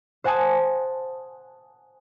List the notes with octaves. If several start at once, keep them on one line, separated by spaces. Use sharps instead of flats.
C5 F#5 G#5 A5 D#6